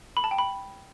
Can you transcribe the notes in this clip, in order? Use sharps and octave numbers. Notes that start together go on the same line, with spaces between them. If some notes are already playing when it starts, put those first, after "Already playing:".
B5
A5
G5
B5